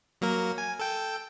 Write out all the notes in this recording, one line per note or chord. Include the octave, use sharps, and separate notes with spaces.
F#3 A#3 A#4
G#5
A4 G5